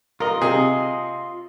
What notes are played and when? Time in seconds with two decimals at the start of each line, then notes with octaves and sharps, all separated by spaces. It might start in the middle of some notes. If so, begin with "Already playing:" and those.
0.20 F4 A#4 D#5
0.42 C3 G#4